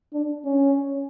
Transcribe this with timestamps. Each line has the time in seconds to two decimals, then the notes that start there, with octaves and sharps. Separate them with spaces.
0.13 D4
0.44 C#4